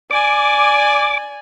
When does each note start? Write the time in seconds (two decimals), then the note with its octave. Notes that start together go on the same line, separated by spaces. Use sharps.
0.11 D5 G#5 D6